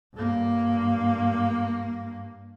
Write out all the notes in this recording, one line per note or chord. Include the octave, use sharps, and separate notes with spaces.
G2 A#3